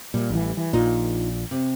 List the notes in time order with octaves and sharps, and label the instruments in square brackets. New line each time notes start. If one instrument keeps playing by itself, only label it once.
[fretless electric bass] A#2 [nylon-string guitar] G3 E5
[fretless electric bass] A1 E3
E3
[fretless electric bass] A#1 A#2 [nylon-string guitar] D#4 F4 D#5
[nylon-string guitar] C3